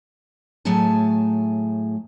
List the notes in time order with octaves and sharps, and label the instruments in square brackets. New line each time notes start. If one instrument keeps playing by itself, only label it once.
[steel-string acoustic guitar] A2 F#3 A3 G#4 G#5 A5